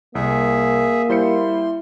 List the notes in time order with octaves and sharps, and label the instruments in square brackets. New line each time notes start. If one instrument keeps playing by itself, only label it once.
[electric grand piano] C2 [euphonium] A#3 [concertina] G#4 E5
[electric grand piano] G3 C5 C#7 [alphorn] E4 [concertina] C6